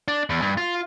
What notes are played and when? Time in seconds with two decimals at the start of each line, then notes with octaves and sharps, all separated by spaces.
0.08 D4
0.30 E2
0.42 G2
0.57 F4